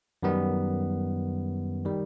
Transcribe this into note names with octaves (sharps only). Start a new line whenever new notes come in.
F#2 D#3 G3 B3
D#3 G3